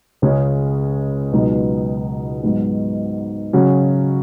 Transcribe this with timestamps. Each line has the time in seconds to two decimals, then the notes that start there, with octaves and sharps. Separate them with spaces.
0.22 C#2 C#3 G#3 C#4
1.33 C#2 B2 F#3 B3 D#4
2.43 G#2 F#3 B3
3.53 C#3 F#3 C#4 F#4